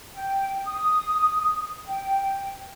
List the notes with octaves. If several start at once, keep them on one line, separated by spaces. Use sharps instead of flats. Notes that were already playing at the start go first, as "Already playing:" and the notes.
G5
D#6
G5